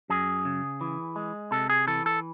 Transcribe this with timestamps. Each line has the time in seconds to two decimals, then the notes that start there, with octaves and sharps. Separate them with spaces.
0.10 F#2 G#4
0.45 C#3
0.81 E3
1.16 G#3
1.52 C3 A4
1.70 G#4
1.87 E3 A4
2.06 A4